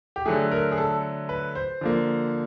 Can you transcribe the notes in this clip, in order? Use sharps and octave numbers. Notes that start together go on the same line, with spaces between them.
G4
D3 F#3 A3 G#4
A#4
G#4
A4
B4
C5
D3 F3 A#3